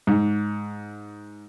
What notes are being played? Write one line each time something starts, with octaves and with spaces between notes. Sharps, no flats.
G#2